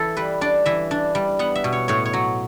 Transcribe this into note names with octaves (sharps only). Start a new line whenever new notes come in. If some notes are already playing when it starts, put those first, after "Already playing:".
Already playing: E3 A4
G3 B4
D4 D5
E3 E5
D4
G3
B3 F#5
E5
B2
C#5
A2 C#5
C#5
F#3